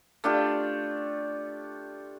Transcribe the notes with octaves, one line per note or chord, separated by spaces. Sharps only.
A3 D4 F4 G4